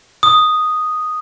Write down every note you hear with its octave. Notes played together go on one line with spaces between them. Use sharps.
D#6